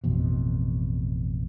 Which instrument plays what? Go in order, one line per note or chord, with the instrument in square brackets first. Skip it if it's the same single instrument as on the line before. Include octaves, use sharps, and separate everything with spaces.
[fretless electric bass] A1 F2 B2